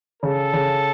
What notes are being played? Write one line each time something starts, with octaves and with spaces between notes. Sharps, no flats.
C#3 A4
C#3